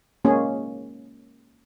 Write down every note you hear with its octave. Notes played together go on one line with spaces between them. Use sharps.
G#3 A#3 C#4 G#4